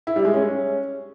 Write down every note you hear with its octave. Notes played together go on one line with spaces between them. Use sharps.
E4
G3
G#3
C#4